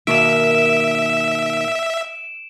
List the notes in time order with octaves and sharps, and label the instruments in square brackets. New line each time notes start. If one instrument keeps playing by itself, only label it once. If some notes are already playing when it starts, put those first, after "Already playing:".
[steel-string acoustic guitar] B2 D#3 A#3 [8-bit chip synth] E5 [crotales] D7 E7